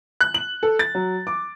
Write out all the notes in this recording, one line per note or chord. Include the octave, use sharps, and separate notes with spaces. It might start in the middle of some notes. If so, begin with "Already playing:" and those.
F#6
F#7
A4
A6
F#3
D6